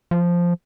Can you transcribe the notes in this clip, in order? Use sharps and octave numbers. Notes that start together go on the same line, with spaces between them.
F3